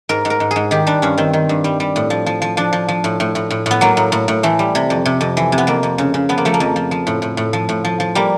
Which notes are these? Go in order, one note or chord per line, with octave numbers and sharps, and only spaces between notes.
G#2 A#4
G#2
A#4
G#2
G#4
G#2
D#3 G4
G3 D4
G2 C#4
D#3 C4
D#3
G2
G3
G3
A2
F3
F3
F3
F3 D4
F3
F3
A2
A2
A2
A2
A2 B3
F#3 A#3
A2
A2
A2
E3 A3
G3
C3
F2
C3
F2
E3
C3
B3
F2 A#3
F2
C#3
C#3
F3 B3
A#3
F3 A3
A#3
F2
F3
F3
A2
A2
A2
F3
A2
F3
F3
G3 A#3